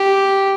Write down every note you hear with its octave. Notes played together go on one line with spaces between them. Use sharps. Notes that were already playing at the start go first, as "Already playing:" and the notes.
Already playing: G4